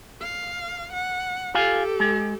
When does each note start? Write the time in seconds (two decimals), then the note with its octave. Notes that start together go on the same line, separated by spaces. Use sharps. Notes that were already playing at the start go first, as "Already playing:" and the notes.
0.21 F5
0.93 F#5
1.55 F4 G4 A4 F5 G#5
2.00 G#3